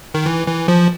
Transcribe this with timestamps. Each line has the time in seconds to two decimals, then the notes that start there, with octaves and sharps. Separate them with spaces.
0.14 D#3
0.26 E3
0.47 E3
0.68 F3